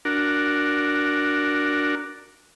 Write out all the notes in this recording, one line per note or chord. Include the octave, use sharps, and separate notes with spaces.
D4 F#4 A#4